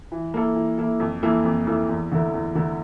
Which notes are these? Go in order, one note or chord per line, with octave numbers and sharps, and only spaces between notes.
E3
A#3 E4 A4
E3
A#3 E4 A4
F2
E3 A#3 E4 A4
F2
E3 A#3 E4 A4
E2
D3 A3 E4 A#4
E2
D3 A3 E4 A#4